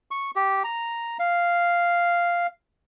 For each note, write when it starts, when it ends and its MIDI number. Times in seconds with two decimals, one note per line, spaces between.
0.11 0.31 85
0.36 0.63 67
0.64 1.17 82
1.19 2.47 77